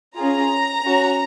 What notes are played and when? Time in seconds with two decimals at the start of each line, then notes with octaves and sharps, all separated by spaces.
0.17 C#4 F4 G#4 A#5
0.83 C#4 F#4